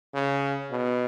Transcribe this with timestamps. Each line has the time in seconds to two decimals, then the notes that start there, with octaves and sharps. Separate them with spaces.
0.15 C#3
0.71 B2